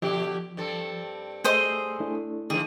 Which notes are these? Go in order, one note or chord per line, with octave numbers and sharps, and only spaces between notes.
B2 D3 F3 G4
G2 C4 A4
A3 G#4 C5 D#5 E6
A3 D4 E4
D3 F3 G#4